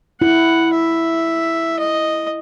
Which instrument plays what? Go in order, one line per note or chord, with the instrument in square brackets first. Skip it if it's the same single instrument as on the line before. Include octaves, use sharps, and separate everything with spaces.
[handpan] E4 [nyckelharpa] F#5
[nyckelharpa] E5
D#5